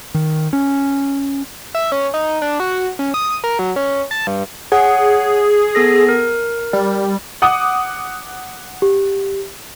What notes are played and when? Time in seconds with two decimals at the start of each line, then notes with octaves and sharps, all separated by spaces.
0.14 D#3
0.53 C#4
1.75 E5
1.92 C#4
2.14 D#4
2.42 D4
2.60 F#4
2.99 C#4
3.14 D#6
3.44 A#4
3.59 F#3
3.76 C#4
4.11 A5
4.27 G2
4.72 G#4 C#5 F#5
5.75 B3 A4 A#6
6.09 A#4
6.73 G3
7.42 F#5 D6 D#6
8.82 G4